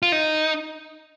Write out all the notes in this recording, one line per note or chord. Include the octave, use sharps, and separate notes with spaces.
F4
D#4